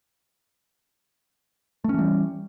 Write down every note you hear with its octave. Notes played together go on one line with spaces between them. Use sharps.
E3 G3 A3 C#4